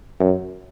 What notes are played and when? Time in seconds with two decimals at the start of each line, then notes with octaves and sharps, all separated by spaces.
0.20 F#2